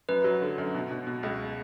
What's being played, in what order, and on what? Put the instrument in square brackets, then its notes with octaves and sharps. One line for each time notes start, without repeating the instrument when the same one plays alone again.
[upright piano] F#2 [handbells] B4
[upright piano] F#3
D3
F#2
B2
B2
B2
C#2